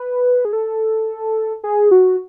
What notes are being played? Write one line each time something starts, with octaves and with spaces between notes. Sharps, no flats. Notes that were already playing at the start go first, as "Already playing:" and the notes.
Already playing: B4
G#4
A4
G#4
F#4